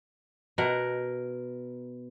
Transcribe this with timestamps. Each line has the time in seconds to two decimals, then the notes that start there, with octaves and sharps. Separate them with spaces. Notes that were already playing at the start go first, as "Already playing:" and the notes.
0.58 B2 A#4 F#5